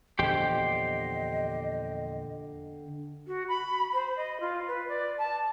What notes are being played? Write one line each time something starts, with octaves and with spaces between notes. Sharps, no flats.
E2 A#2 D3 F3 G4 C5 D#5 G5
F#4
B5
C5
D#5
F4
B4
D5
A5